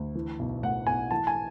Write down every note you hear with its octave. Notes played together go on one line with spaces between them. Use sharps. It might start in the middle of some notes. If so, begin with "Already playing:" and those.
Already playing: D2
E3
B1
A2 F#5
B1 G#5
E3 A5
G#5